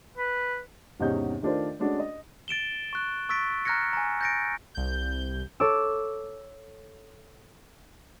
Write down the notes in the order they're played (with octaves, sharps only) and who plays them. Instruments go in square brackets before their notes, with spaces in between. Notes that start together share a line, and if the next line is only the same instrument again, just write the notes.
[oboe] B4
[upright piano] G#1 E2 C3 C#4 D#4 G6
D#3 A3 D4 F4 A#4 C5
G#3 A3 C#4 D4 F#4
D#5
[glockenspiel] A6 D7 E7 G7
C#6 F#6
C#6 E6 A6 B6 D7
A#5 F6 F#6 G#6 A#6 C#7
G#5 A#5
G6 A6 A#6 C#7 D7
[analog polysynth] C2 G6
[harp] A4 C#5 D6 E6